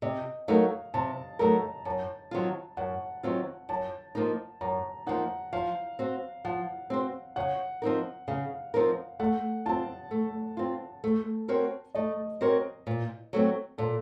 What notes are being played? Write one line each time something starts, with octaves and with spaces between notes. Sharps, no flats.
C3 D#5
F#3 A3 D#4 A#4 F5
C3 A5
F#3 A3 D#4 A#4 A#5
F#2 A5
D#3 F#3 C4 F4
F#2 F#5
D#3 F#3 C4 F4
F#2 A5
F3 A#3 D#4
F#2 A#5
F3 A#3 D#4 F#5
F3 F5
C4 F#4 C5
F3 F#5
C4 F#4 C5
C#3 F#5
F3 C4 D#4 A#4
C#3 F5
F3 C4 D#4 A#4
A3 F#5
C4 F4 A5
A3
C4 F4
A3
C4 F#4 A#4 C#5
A3 D#5
C4 F#4 A#4 C#5
A#2
F#3 A3 C4
A#2 A4